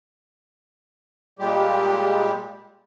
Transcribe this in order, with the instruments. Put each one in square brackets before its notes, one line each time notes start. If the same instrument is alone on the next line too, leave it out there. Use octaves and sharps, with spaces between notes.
[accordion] A#2 G3 G#3 G4